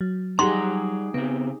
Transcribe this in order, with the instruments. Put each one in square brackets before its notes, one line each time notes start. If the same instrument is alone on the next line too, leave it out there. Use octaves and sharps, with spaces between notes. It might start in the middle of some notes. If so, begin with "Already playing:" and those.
[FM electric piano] F#3
[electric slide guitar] G3 F#5 A#5 [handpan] D#4 G4 G#4 [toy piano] C6
[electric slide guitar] C#3 C4 [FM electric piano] B3